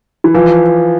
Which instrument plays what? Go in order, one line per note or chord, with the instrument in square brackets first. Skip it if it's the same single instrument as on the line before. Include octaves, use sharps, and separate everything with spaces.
[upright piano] E3
[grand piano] E3 [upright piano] F3